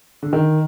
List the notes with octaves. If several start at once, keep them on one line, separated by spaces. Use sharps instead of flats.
D3
D#3